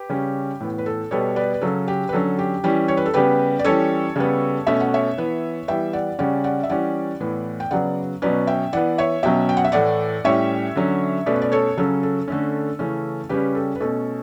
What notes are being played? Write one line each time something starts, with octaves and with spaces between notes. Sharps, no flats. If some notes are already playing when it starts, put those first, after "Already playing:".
Already playing: G4 B4
C#3 G3 C#4
A2 E3 B3
B4
A4
B2 G3 B3 A4 C#5
B4 D5
B4
C#3 F#3 C#4 A4
G4
B4
D3 F#3 C#4 A4
G4
E3 G3 C#4
C#5
B4
A4
C#3 G3 B3 G4 B4
D5
E3 G3 C#4 A4 C#5
C#3 G3 B3
B2 A3 C#4 E5
F#5
C#5 E5
E3 B3
E3 G3 B3 E5 G5
D5 F#5
C#3 G3 C#4 D5 F#5
D5 F#5
E5
E3 G3 C#4 D5 F#5
A2 E3 B3
G5
C#3 F#3 B3 D5 F#5
B2 F#3 C#4 B4 D5
E5 G5
E3 B3 D5 F#5
C#5 E5
B2 F#3 C#4 E5 G5
G5
F#5
E5
A2 E3 A3 D5 F#5
A2 G3 C#4 C#5 E5
D3 F#3 C#4
B2 A3 C#4 B4 D5
D5
A4 C#5
C#3 F#3 C#4 A4
A4
D3 A3 C#4
C#3 E3 A3 C#4
C#3 G3 C#4 G4 B4
A4
B4
B2 A3 C#4 A4